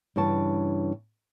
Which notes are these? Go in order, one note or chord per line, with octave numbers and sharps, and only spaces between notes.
G2 C#3 E3 C#5 A5